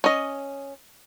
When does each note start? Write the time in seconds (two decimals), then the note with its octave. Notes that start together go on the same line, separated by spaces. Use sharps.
0.04 C#4 D#5